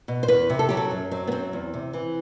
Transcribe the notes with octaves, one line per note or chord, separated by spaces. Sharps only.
B2
C5
E2 B4
C3
A4
F#3 G4
A4
F#2
F#3 C4
B3
F#2 C4
E2
C3
E3